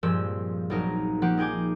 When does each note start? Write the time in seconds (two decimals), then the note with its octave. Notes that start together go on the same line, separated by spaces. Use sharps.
0.03 G2 A#2 F3 G#3 C4 E6
0.70 A#1 F#3 D#4 A#4
1.22 F3 A#3 G4 F#5
1.37 D#4 G#4 G5 G#5 D6